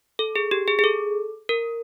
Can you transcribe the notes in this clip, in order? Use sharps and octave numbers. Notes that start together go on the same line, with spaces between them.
A4
G#4
G4
G#4
G#4
A4
A#4